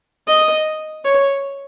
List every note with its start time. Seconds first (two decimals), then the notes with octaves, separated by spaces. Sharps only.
0.27 D#5
1.05 C#5